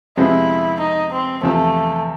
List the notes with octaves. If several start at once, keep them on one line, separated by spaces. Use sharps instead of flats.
F2 C3 F3 G#3 B3 E4
D#4
C4
E2 C3 F3 A3